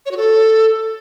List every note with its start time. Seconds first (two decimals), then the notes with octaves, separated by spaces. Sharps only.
0.05 C#5
0.11 F#4
0.16 A4